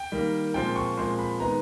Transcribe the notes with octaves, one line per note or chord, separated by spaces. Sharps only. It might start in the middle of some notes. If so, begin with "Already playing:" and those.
Already playing: G5
D#3 G3 A#3
A#2 F3 G#3 C4 G5
C#6
A#2 F3 G#3 C4 C6
B5
D#3 G#3 B3 A#5